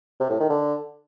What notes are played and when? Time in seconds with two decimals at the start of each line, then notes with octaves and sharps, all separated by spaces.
0.20 C3
0.30 A2
0.40 D#3
0.50 D3